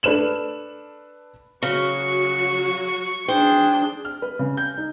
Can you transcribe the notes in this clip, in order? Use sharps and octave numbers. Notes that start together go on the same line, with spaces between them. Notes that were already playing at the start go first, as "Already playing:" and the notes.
D4 A4 B4 F6 E7 F#7
C#3 F#3 F#4 C#6
D4 G#4 C5 G5
F6
B4
C#3
G6
D#4